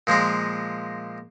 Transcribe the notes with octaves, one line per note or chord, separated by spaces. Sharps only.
A#2 F3 G#3 A#4